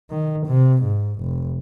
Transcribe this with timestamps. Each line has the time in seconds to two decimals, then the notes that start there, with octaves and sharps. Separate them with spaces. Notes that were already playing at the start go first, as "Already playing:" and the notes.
0.10 D#3
0.47 C3
0.83 G#2
1.20 F1